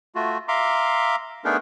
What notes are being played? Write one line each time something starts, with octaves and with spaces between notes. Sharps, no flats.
A3 F4 F#4
E5 F5 A#5 C6 D6
A3 B3 D4 D#4 G#4 A#4